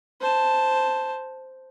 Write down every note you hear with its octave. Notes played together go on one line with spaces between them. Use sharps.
C5 A5